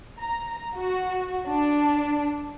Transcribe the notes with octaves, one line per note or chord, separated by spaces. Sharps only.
A#5
F#4
D4